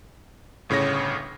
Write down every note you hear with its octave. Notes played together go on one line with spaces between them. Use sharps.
G1 A2 C#3 C#5 A#6